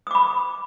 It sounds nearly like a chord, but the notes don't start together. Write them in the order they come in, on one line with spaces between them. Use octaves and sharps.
D#6 D6 B5